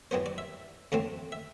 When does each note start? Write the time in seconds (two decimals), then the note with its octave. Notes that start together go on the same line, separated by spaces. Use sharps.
0.11 F#2 E3 G3 B3 C5
0.26 D5
0.38 E5
0.92 F#2 D3 A3 C4
1.32 E5